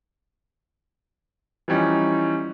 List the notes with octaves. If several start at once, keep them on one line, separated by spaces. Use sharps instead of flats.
E3 F3 G3 C#4 D#4